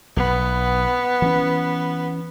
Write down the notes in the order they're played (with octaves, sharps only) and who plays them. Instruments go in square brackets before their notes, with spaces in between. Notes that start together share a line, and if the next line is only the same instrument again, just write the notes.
[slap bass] B1 [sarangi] B3
[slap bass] E3 C4 C#4